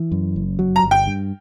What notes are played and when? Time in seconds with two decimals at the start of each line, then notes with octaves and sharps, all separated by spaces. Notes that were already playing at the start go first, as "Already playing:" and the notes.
Already playing: E3
0.11 F#2
0.36 F#1
0.59 F#3
0.76 A#5
0.84 G1
0.91 G5
1.07 G2